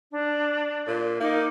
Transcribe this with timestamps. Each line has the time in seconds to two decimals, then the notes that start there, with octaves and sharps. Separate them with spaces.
0.12 D4
0.87 A#2
1.20 A#3 D#4 D6